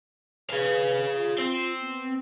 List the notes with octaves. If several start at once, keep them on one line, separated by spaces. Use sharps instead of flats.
G#4 B4 F5
F4
C4
B3